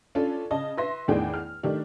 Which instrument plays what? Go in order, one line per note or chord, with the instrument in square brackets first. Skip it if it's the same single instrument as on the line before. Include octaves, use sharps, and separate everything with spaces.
[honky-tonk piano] C#4 D4 F4 A4
C#3 D#5 A5
B4 E5 C6 A#6
E2 A2 D#3 D4 G#4 G5
F6
D#3 A3 D4 G4